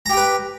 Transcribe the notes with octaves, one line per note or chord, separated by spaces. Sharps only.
G4 B4 G5 A#5